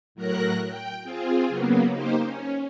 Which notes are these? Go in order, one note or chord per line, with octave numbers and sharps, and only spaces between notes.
A2 F#3 A#4 A#5 F#6
G5
C4 F4 G#4
C#3 F#3 A#3 B3
A#3 D#4 G4 C5
C#4